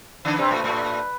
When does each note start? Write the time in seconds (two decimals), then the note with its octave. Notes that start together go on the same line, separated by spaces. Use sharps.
0.25 D3 D4 B4
0.38 C3 C4
0.51 A2 A3
0.64 A2 A3